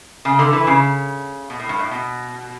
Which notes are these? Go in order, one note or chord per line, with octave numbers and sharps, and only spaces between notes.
C#3
D3
E3
C#3
B2
A2
G2
A2
B2